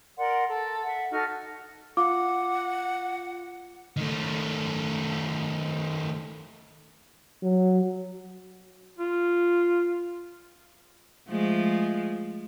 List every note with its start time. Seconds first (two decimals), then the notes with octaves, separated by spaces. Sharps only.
0.18 A#4 D5 F#5 C6
0.46 A4
0.83 E5 F#5
1.11 D#4 F#4 A4 F6
1.97 F4 F#5 D6
3.97 D#3 A3
7.43 F#3
8.98 F4
11.29 F3 G#3 A3